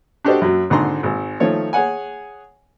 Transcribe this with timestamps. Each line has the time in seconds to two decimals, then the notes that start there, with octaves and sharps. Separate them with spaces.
0.24 D4 F#4 G4 A4 C5 D#5
0.41 F#2 F#3
0.70 G#1 D3 D#4 A#5 C6
1.03 G#1
1.40 D#3 F3 A3 C#5
1.73 G#4 C#5 F#5 G#5